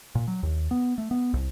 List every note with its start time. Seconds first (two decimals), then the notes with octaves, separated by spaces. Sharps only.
0.15 A#2
0.28 F#3
0.43 D#2
0.71 B3
0.98 A3
1.11 B3
1.34 C2